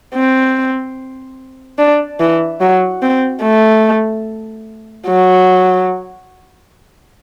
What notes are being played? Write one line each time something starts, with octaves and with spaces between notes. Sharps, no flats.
C4
D4
E3
F#3
C4
A3
F#3